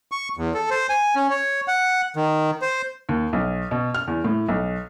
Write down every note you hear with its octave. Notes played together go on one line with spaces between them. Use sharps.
C#6
E2
A4
C5
G#5
C#4
C#5
F#5
D#3
C5
D#2
B1
B2
F6
E2
A2
B1